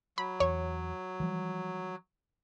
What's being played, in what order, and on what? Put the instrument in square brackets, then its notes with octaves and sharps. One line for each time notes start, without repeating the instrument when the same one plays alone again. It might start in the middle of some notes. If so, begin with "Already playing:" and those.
[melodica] F#3 [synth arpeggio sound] B5
[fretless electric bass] E2 [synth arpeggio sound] C#5
[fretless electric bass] E3 F3 G3